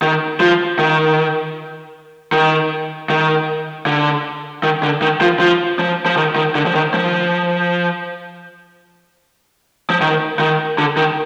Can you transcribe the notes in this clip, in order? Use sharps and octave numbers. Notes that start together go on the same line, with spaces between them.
D#3
F3
D#3
D#3
D#3
D3
D#3
D3
D#3
F3
F3
F3
F3
D#3
D#3
D3
F3
D#3
F3
F3
D#3
D#3
D3
D#3